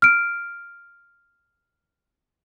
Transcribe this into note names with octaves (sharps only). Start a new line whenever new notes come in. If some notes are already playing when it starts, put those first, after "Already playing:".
F6 D7